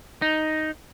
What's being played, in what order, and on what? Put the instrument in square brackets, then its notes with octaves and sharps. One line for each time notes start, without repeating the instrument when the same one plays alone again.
[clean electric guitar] D#4